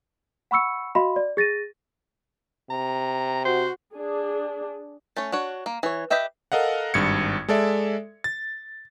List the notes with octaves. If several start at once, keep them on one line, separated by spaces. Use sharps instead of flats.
F#5 B5 C#6 E6 C#7
F#4 D#5 F5 B5 C6
D5
G#4 A6 A#6 D#7
C3 A#5
F#4 C5
D4 G#4
A3 C#4 C#5
D4 F#4 C#5
A#3
E3 C#5
G4 B4 D#5 E5 G5
A4 A#4 D#5 F5 F#5
G#1 G2 G#6 C#7
G#3 A4 D5 E5
A6